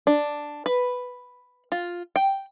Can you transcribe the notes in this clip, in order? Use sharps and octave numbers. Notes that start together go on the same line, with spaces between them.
D4
B4
F4
G5